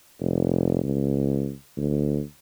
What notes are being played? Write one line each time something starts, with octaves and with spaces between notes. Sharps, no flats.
F1
C#2
D2